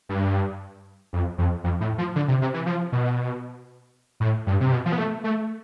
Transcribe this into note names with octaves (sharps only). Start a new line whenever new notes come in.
G2
F2
F2
F2
A2
F3
D3
C3
C3
E3
F3
B2
A2
G2
C3
B2
F3
B3
A3
A3